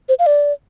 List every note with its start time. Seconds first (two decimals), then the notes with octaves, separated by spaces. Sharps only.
0.09 C5
0.19 F5
0.26 D5